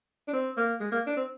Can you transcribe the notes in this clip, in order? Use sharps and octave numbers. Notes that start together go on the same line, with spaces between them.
D4
C4
A#3
G#3
A#3
D4
C4